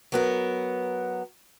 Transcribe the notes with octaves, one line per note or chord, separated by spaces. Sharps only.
F#3 B3 A#4